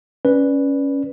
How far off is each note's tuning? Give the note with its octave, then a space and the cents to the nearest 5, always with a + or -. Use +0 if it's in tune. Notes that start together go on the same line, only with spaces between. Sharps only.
C#4 +0 B4 -5 D5 +0